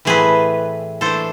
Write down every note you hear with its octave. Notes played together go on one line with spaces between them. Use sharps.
A2 E3 A3 C4 G#4 B4
E3 A3 D4 A4 C5